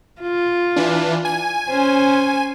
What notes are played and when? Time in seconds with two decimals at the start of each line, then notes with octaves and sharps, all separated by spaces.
0.21 F4
0.76 E3 D4
1.25 G#5
1.69 C#4 C5